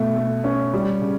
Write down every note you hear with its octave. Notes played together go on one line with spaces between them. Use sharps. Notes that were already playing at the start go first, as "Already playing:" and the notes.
Already playing: B2 A3
A3
C#4
G3
C#3